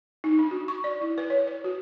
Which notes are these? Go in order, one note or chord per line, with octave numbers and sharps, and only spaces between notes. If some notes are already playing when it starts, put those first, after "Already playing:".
D#4
D4
F#4
C#6
D5
E4
B4
C#5
B4
F#4